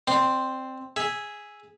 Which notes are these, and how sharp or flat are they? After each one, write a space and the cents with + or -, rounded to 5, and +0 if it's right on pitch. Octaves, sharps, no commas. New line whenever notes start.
C4 +0 D5 +35 C6 +0
G#4 +0 E5 +0